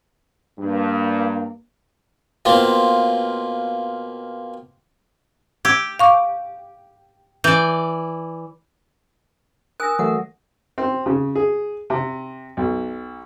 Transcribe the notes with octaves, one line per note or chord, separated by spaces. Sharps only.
G2 A#3
B2 A#3 C4 F4
G4 E6 G#6
F5 C#6 D6
E3 D5 G6
A#4 G#5 D#6 F#6 A#6
E3 F#3 A3 A#4 F#5
C4
C#3
G#4
C3
B1